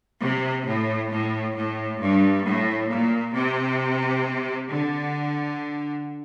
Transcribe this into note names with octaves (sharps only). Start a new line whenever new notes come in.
C3
A2
A2
A2
G2
A2
A#2
C3
D3